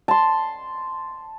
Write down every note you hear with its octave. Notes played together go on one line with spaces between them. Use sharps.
A5 C6